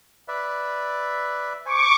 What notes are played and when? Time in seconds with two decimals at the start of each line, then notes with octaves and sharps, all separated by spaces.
0.28 B4 D5 E5
1.66 C5 G#5 C#6 D6